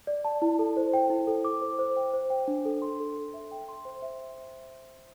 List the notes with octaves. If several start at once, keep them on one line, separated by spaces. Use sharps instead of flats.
D5
A5
E4
A4
C5
G5
E4
A4
D6
C5
C5
G5
C5
G5
D4
A4
C6
A4
A4
E5
G5
C6
C5
E5